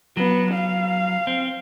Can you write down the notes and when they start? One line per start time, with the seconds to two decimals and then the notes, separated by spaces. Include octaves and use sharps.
0.17 F#3 B3
0.54 F5
1.27 C4